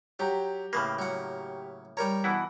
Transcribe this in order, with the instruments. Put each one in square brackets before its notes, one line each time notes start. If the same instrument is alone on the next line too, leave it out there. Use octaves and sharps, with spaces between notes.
[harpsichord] F#3 [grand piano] G4 A#5
[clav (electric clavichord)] A2 C#3 A#3 [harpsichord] B4
[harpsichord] F#3 F#5
[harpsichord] G3 A#4 C#5 [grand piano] A#5
[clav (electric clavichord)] B2 E3 E4 [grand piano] F#5